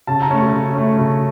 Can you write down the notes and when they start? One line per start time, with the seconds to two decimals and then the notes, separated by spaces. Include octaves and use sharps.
0.07 C#3 A5
0.22 A#5
0.31 A3 C#4
0.38 C#6
0.53 C#3
0.75 A3 C#4
0.98 C#3